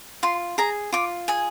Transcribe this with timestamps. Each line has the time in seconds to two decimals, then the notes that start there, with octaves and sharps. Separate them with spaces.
0.23 F4 C6
0.58 G#4 A#5
0.93 F4 D6
1.28 G#4 G#5